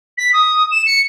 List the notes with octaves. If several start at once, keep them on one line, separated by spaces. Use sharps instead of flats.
B6
D#6
E7
C#7